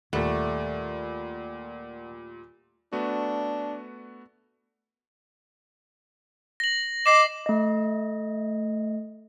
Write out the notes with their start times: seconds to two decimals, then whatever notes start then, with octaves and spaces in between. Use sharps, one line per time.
0.13 D#2 A#2 G3 A3 D5 F#5
2.93 A3 B3 D4 F#4
6.60 A#6 F#7
7.06 D#5 D6 A#6 C7 E7
7.46 A3 D#5